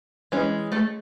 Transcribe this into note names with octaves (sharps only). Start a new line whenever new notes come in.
E3 G#3 C#4
A3 A4